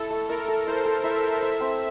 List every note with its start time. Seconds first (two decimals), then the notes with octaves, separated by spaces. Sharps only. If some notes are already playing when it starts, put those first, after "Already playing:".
Already playing: E4 A4
0.10 A3
0.28 E4 A#4
0.48 A4
0.67 E4 C5
0.85 A4
1.04 E4 E5
1.23 A4
1.42 E4 E5
1.60 C4